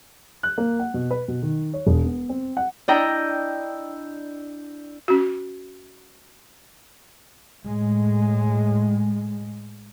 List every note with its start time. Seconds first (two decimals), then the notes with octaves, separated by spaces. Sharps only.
0.43 F#6
0.58 A#3
0.79 F#5
0.94 B2
1.11 B4
1.28 B2
1.42 D#3
1.74 C#5
1.87 E1
2.05 B3
2.29 C4
2.57 F#5
2.88 D4 E4 D#5 G5 A#5
5.08 C#4 F#4
7.63 A2 G#3